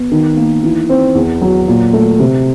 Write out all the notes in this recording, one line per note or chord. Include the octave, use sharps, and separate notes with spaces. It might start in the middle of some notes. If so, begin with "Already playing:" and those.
Already playing: B3
D#3
A#3
E3
C4
E2
F#3
A#2
A3
C3